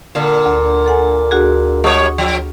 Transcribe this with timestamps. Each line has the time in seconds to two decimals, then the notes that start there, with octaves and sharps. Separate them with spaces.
0.15 A#2 D3
0.46 D2
0.86 A4 F#5 G#5
1.31 D2 F#4 G#4
1.84 G3 C#5 F#5 C#6 D#6
2.18 F3